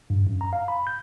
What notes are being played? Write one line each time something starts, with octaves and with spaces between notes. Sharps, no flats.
G2
F#2
A#5
F5
B5
G6